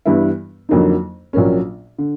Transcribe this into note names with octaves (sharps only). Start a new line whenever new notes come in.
G2 E3 G3 B3 E4
F2 D3 F#3 A#3 D#4
A#1 A#2 F#3 A#3 C#4
D3